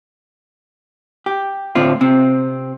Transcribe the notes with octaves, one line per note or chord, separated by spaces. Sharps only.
G4
A2 D3 C4 F4
C3 C4